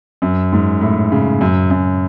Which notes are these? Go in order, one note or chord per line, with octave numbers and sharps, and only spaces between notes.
F#2
G#2
A2
C#3
F#2
F#2